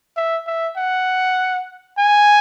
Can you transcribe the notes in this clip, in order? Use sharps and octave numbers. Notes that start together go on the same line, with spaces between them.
E5
E5
F#5
G#5